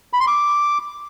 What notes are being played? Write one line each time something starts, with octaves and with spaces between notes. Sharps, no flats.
B5
C6
D6